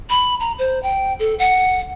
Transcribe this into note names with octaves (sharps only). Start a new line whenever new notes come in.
B5
A#5
C5
G5
A4
F#5